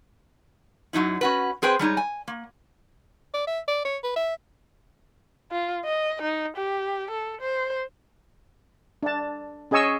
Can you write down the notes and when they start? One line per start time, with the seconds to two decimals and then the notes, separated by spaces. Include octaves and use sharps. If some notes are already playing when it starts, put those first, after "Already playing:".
0.93 F#2 F#3 D#4 E4
1.21 C#4 F#4 B4
1.62 C4 G#4 B4 C5 G5
1.79 G3 G#3 D#4 C#5
1.97 G#5
2.28 A#3
3.34 D5
3.47 E5
3.68 D5
3.85 C#5
4.04 B4
4.16 E5
5.52 F4
5.85 D#5
6.22 D#4
6.56 G4
7.11 A4
7.41 C5
9.03 D4 A5
9.71 C#4 G#4 D#5 G#5 C#6 E6